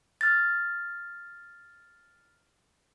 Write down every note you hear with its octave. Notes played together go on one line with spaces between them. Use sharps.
F6 A6